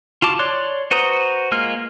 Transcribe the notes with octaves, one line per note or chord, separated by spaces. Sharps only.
F4 F#4 A5 D6
C#5 D5 C6 F#6
F#4 B4 C5 A#5 D#6
G#3 A#3 F4 F6